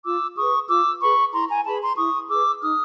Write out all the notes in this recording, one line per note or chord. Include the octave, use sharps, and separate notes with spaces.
F4 D6 E6
G#4 B4 C#6 D#6
F4 D6 E6
G#4 B4 B5 C#6
E4 A#5 C6
G#5 A#5
G#4 B4 A5 B5
A#5 C6
E4 C#6 D#6
G#4 B4 D6 E6
D#4 D#6 F6